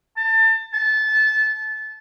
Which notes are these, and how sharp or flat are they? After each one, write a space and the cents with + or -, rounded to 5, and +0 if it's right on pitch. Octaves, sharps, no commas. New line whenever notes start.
A5 +30
A5 -20